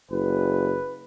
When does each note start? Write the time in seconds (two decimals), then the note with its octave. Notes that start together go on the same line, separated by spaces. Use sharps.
0.11 F#1 B4